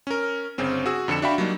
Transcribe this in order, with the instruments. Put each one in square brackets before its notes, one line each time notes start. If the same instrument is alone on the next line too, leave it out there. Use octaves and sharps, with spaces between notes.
[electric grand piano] C#4 A#4
G1 C#3 C4 C#4
F#4 G#4 E6
F2 D3 A4 C#7 E7
D4 F#4 E5 F5 G5 B5
F#3 G3 A#3 D4 D#4